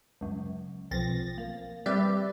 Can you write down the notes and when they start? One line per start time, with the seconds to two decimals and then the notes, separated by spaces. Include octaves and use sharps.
0.21 C#2 F#2
0.91 B1 F3 C4 A6 A#6
1.38 A#3
1.86 G3 C4 G4 B4 D5 E5